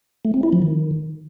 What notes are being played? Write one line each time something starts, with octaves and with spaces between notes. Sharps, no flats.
A3
C4
E4
F3
D#3